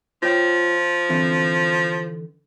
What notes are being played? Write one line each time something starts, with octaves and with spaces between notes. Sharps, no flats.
F3 F4 C#5 G5
D3 E3 C4